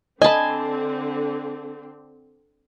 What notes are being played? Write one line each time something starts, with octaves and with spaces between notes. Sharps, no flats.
D3 C4 D#5 G#5 A5 B5